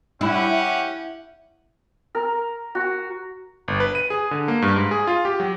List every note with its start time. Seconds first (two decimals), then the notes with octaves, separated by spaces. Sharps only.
0.21 C#4 E4 G4 F#5
2.15 A#4
2.75 F#4
3.68 G1
3.80 B4
3.95 D#7
4.10 G#4
4.31 D3
4.48 A#3
4.62 G2
4.76 G#2
4.91 G#4
5.07 F4
5.25 G4
5.40 F#3